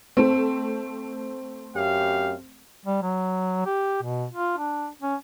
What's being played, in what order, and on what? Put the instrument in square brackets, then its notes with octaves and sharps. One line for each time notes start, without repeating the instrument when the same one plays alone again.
[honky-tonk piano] A3 C4
[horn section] F#2 G4 F5
[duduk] G3
F#3
G4
B2
F4
D4
C#4